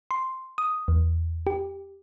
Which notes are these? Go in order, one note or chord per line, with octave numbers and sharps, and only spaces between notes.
C6
D#6
E2
G4